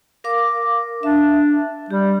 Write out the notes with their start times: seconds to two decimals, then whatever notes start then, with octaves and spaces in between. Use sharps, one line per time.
0.24 A#4 F5 D6
1.03 D4 E5
1.91 G3 G4